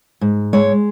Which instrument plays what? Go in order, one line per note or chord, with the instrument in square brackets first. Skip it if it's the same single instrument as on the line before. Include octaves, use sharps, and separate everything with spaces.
[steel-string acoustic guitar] G#2
G#3 C#5